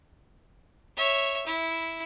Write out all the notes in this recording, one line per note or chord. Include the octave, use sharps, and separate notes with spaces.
C#5 E5
E4